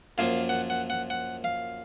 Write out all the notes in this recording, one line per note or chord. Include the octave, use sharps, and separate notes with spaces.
F#2 F3 A#3 F5
F#5
F#5
F#5
F#5
F5